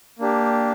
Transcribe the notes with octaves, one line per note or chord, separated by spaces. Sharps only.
A#3 D4 G4